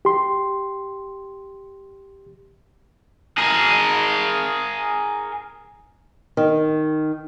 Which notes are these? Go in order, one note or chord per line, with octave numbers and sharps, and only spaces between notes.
G4 C6
G#4 A#4
D#3